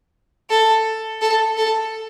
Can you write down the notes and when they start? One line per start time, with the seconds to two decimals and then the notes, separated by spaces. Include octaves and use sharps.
0.50 A4
1.21 A4
1.57 A4